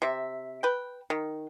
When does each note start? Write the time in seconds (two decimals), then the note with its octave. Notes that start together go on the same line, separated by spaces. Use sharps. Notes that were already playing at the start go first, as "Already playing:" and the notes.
0.02 C3 E5
0.63 B4 G5
1.10 D#3